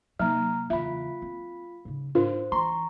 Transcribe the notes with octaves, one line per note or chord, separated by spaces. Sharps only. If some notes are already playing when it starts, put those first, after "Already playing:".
C3 F#3 A#3 D#4 A#5 F6
E2 C#3 F4 E5 B5
C4
G#2 C#3
G#2 D4 F4 A#4 C5
E3 E4 A#5 C6 C#6